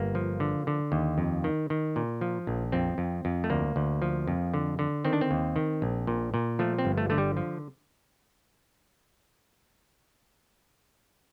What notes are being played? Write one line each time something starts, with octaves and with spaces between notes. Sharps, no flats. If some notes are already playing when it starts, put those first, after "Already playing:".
Already playing: G1 A#3
F3
D3
D3
D#2
F2
D#3
D#3
A#2
F3
A#1
F2 C4
F2
F2
A3
D2 A#3
D2
F3
F2
D3
D3
D#3 C4
D4
C4
D#2
D#3
A#1
A#2
A#2
F3 A3
C4
G1
A3
D3 A3
G3
F3